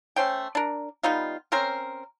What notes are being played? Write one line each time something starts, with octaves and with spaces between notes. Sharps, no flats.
A3 C#4 C5 G5
D4 A#4
G3 B3 D#4 F4
C4 C#4 A#4 C5